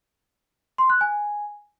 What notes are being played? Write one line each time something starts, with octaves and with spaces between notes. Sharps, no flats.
C6
F#6
G#5